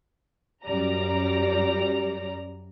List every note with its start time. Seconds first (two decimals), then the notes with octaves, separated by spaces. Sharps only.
0.64 F#2 G3 D5 A#5